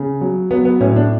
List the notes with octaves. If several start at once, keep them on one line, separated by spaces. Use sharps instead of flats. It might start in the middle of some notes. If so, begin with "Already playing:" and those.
Already playing: C#3
F#3
F#3 B3
B3
A2 C#4
D4